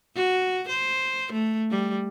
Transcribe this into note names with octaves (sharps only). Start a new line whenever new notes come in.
F#4
C5
A3
G3